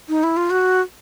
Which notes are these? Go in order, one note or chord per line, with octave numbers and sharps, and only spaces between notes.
D#4
E4
F4
F#4